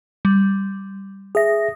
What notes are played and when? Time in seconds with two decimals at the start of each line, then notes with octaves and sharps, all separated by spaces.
0.25 G3
1.35 G#4 E5 D#6 A#6